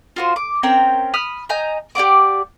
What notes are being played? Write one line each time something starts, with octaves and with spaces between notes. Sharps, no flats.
F4 F#4 C5
D6
C4 C#4 A#4 G5
B5 D#6 F6
D#5 G#5 A#5 G6
G4 D5 F#5 D6